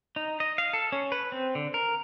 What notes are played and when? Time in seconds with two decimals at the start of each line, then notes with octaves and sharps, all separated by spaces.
0.16 D#4
0.40 D#5
0.58 F5
0.73 A4
0.92 C#4
1.12 B4
1.32 C4
1.55 D3
1.74 A#4